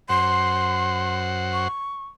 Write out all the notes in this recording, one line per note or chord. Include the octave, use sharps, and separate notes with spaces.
F#2 C5 F#5 C6
C#6